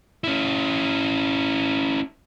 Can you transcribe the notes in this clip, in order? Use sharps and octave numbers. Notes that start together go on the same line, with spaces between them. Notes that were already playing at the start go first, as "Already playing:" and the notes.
C#4 E4